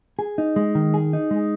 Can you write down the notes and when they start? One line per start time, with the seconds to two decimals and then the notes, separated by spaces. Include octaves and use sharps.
0.19 G#4
0.38 D#4
0.56 G#3
0.75 D#3
0.94 G#4
1.13 D#4
1.31 G#3